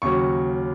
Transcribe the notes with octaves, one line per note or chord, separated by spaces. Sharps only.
D#2 C#3 F#3 C#6